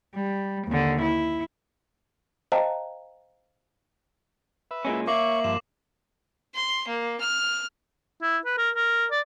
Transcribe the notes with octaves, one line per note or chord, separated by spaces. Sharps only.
G3
D#2 D3
E4
C5 D#5 F5 G5 A5 A#5
B4 E5
A#2 G#3 C#4
A#3 C#5 E5 C#6 D6 C7 F#7
G2 F3 E7
C6
A#3
F6
E4
B4
A#4
A#4
D5